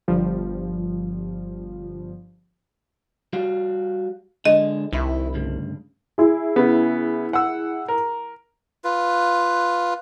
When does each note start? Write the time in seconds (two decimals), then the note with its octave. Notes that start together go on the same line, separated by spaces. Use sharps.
0.08 G1 F3 G3
3.33 G3 F#4 F5
4.45 D3 G#3 D#5
4.93 C2 D#3 E4
5.34 D2 G2 C#3
6.18 E4 G#4
6.56 C#3 B3
7.33 F#5 E6
7.88 A#4
8.84 F4 B4